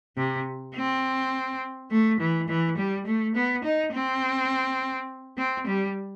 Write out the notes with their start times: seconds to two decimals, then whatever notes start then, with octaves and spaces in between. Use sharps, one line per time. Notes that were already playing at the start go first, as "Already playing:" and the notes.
0.17 C3
0.76 C4
1.91 A3
2.20 E3
2.48 E3
2.77 G3
3.06 A3
3.35 B3
3.64 D#4
3.93 C4
5.38 C4
5.67 G3